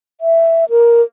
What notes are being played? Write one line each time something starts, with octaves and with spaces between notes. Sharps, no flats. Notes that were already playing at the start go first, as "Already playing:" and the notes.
E5
A#4